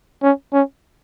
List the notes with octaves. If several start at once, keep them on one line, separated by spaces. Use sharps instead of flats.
C#4
C#4